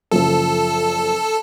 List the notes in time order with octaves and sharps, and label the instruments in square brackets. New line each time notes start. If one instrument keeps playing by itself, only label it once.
[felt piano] F#1 F3 [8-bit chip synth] A4